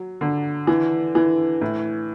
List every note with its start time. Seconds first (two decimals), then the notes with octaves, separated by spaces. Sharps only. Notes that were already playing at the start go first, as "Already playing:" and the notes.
Already playing: F#3
0.21 D3
0.67 E3
1.15 E3
1.61 A2